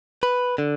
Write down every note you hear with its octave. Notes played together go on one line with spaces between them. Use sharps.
B4
D3